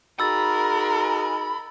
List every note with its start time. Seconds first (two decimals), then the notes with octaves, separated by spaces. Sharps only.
0.20 D#4 F#4 G#4 A#4 B5 E6 A6